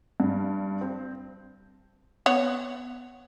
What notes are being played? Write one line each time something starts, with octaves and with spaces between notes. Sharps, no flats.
G2
C4
B3 C#5 F#5